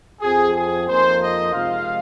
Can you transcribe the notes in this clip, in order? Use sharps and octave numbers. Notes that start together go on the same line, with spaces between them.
F2 F3 C4 G#4
G#4
F2 F3 A#3 D#4 C5
D#5
C3 F3 G#3 F4 F5